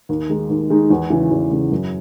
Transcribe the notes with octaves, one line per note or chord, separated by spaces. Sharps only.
D#2
D#3 G#3 D#4
D#2
D#3 G#3 D#4
E2
C#3 E3
E2
C#3 E3
F#2